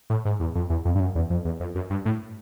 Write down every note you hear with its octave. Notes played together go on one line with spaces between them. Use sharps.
A2
G#2
E2
F2
E2
F2
G2
F#2
E2
F2
E2
F2
F#2
G2
A2